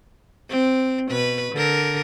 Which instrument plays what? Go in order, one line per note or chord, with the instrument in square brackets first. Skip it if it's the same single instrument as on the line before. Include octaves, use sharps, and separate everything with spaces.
[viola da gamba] C4
B2 B4
D3 A#4